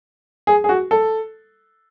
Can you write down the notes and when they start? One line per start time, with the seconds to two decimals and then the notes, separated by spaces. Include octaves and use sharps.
0.47 G#4
0.64 G#4
0.69 F#4
0.91 A4